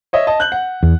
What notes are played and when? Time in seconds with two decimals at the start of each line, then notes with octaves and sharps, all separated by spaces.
0.13 C#5 D#5 E5
0.27 D#5 A5
0.40 F#6 G6 F#7
0.52 F#5
0.83 E2